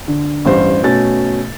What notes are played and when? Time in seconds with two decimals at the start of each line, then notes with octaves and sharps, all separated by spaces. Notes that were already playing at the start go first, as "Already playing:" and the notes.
0.08 D3
0.45 A1 G2 C5
0.83 B2 A3 C#4 A6